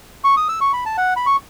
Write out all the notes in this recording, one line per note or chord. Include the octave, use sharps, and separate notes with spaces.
C#6
D#6
E6
C#6
B5
A5
F#5
B5
C#6